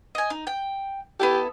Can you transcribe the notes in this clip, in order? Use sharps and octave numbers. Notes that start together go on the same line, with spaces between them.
D#5 G#5
D#4
G5
B3 E4 G4 A4